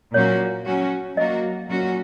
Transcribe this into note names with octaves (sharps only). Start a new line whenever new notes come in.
A#2 F#3 A#3 C#4 F#4 C#5
F#3 C#4 F#4
F#3 A#3 F#4 D#5
A#2 F#3 C#4 F#4